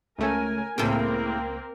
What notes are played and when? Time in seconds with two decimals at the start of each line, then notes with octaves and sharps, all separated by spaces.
0.18 C#2 A3 C#4 A#4 G#5
0.78 C#2 A2 C#3 A#3 C4 A#4 G5